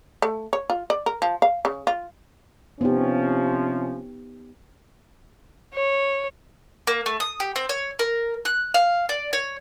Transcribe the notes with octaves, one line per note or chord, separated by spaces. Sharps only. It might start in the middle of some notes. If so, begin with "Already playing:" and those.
A3
C#5
F4
D5
A#4
F3
F5
C#3
F4
C3 F3 B3 C#4 D#4 G4
C#5
A#3
A3
D#6
G4
C4
C#5
A#4
F#6
F5
D5
C#5